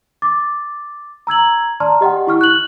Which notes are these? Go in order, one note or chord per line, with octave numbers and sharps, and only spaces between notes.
D6 A6
A#5 E6 G#6 F#7
D5 A5 A#5 C6 F6
G4 D#5 F#5 G5
E4 C#6 F6
F#6 F#7